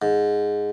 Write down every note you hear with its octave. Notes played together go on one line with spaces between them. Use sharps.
G#2